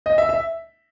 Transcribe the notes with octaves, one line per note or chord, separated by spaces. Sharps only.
D#5
E5
E5